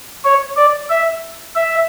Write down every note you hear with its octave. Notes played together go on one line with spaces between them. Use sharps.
C#5
D5
E5
E5